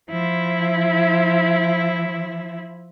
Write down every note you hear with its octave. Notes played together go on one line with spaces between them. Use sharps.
F3 E4